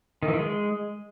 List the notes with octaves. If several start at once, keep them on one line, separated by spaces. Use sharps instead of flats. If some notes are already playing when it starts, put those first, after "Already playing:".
D#3
E3
D#3
G#3